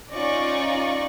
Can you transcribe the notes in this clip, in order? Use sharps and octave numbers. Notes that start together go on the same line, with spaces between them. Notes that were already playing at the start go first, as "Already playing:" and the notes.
C#4 D#4 F4 D5 D#5 C#6